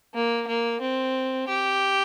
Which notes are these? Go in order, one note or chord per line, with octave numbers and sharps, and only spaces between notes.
A#3
A#3
C4
G4